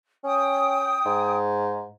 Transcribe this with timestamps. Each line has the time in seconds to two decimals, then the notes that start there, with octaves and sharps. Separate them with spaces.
0.24 C#4 G5 D#6
1.06 G#2